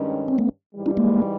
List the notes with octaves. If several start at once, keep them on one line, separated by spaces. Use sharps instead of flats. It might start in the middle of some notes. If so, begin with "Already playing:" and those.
Already playing: G2 D#3 G#3 C#4
C4
A3 B3
G#2 E3 G3
D4 E4
G#3 A#3